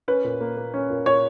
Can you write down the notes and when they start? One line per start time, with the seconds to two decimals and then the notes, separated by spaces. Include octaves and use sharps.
0.08 C#4 B4
0.24 A#2
0.41 A#3
0.57 A#3
0.74 C#4
0.90 A#2
1.06 A#2 C#5